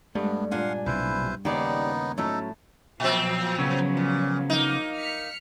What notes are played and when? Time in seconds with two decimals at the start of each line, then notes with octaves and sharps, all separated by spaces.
0.15 G2 G#3 A3 B3 D4
0.51 A#2 D4 F5 F#5 G#5 C6
0.86 B1 C3 E4 B4 C5
1.45 D#2 C#3 B3 D#4 G4 D5
2.18 A2 F#3 C#4 D#4 A4 A5
3.00 A#2 F3 F#3 C4
3.59 C#3 B3 C#4
3.97 A#2
4.50 A#3 D#4
4.96 F6 B6 C#7